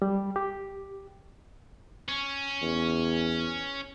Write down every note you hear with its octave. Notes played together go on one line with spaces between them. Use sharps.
G3
G4
C#4
E2